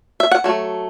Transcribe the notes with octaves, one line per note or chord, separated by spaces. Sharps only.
E5
F#5
F#3 A3